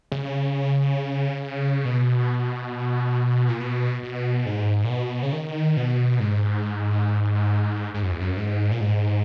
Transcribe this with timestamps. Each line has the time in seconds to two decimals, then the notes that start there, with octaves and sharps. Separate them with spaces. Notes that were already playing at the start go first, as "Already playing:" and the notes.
0.12 C#3
1.85 B2
3.49 A#2
3.60 B2
4.03 B2
4.46 G#2
4.84 A#2
4.90 B2
5.23 C#3
5.32 D#3
5.77 B2
6.20 G#2
7.94 G#2
8.03 F#2
8.11 E2
8.20 F#2
8.37 G#2
8.72 A#2
8.80 G#2